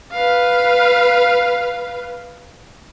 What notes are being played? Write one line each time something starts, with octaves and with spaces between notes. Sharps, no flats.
B4 F5